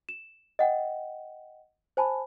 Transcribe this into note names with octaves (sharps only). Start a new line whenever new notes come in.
E7
D#5 F#5 G5
C5 G#5 A5 B5